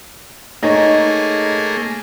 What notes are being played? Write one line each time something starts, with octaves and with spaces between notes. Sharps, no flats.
A3 A#3 D#4 G#4 C#5